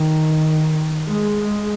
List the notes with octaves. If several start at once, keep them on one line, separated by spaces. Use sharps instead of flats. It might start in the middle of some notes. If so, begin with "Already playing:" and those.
Already playing: D#3
G#3